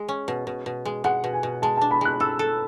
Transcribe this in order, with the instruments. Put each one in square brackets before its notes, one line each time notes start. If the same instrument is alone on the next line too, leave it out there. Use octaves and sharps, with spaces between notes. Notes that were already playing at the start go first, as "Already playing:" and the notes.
Already playing: [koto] G#3
C#4
B2
B2
B2
G#3
[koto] G#3 [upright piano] F#5
[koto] B2
[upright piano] G#5
[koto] B2
[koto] G#3 [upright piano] A5
[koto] D4 [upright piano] A5
[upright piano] B5
[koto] G#3 [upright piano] F#6
[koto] A4 [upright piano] E6
[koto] A4